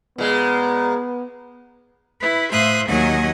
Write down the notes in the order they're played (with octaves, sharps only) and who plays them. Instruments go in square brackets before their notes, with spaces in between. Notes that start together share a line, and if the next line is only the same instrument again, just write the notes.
[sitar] A#2 G#3 [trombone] B3
[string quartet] E4 B4
A2 C5 E5 F5 D#6 F#6
D#2 D#3 F#3 D#5 F#5 G#5